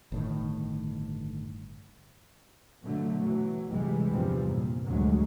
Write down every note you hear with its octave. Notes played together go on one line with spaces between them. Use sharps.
G1 A2 D#3
B2 D3 F#3 A3
E3 F#3
G1 C3 E3 G3 G#3
E2 G2 C3 F3 G3 C4
A#2
D2 G2 F#3 G#3